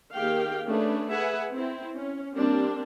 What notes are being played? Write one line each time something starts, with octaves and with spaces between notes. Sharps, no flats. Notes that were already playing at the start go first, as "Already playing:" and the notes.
D#3 A#3 G4 G#4 F5 G5
A3 C#4 D4 G#4 B4
G#4 B4 E5 F#5 G#5
C4 E4
C#4
G3 A#3 C4 D4